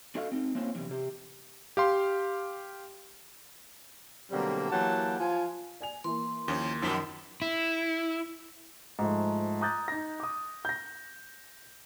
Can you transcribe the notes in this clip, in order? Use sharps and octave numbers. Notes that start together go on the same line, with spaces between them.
D4 F#4 A4 D#5 F5
C4 D#4
A#3 C4 C#4 F4 C5
B1 E2 C3 D4
C3 G4
G4 F5 C6
B2 D3 F#3 G3 A#3 C4
E3 F#3 A#3 G4 F#5 A5
F3 F4 G#5
D5 G#5 F7
E3 A#3 E4 C6
D#2 F3 C#4
F#2 B2 D#3 F3 B6
E4
G#2 F3 A3
A#5 D6 D#6 F#6 G6 A6
D#4 A#6
D6 D#6
G6 A#6